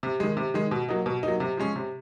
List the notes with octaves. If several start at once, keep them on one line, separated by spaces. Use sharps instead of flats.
C3
D#3 G#3
C3
D#3 G#3
B2
F#3 A#3 D#4
B2
F#3 A#3 D#4
C3
F3 G#3 C#4
C3